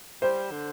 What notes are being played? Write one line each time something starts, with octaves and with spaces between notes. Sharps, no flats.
G3 C5
D3